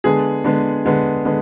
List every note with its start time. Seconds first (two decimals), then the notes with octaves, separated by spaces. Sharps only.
0.04 D3 G#3 B3 G#4
0.44 D3 G#3 B3
0.86 D3 G#3 B3
1.25 D3 G#3 B3